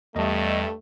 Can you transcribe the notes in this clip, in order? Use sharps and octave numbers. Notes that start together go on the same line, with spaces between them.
E2 G2 G3 A3 D#5